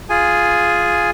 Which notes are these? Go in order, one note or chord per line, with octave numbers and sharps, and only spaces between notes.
F4 G#4 G#5